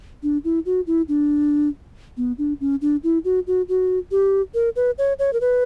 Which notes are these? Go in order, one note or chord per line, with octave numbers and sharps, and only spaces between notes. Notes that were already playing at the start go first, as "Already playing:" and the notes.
D4
E4
F#4
E4
D4
B3
D4
C#4
D4
E4
F#4
F#4
F#4
G4
A#4
B4
C#5
C#5
A#4
B4